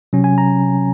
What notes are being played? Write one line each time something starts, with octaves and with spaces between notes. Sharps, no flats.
C3 F#3 C#4
G#5
A#5